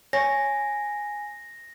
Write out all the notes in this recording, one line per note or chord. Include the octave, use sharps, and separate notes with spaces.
C#5 G#5 A#6